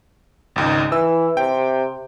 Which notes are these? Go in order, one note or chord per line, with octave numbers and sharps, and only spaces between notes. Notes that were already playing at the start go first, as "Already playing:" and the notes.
G#1 C#2 D#4
E3 E6
C3 G5